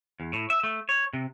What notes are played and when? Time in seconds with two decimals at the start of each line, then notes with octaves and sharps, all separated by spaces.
0.20 E2
0.33 A2
0.50 E5
0.64 A3
0.89 C#5
1.13 C3